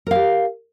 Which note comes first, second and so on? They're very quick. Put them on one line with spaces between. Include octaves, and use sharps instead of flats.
A#4 F5 G4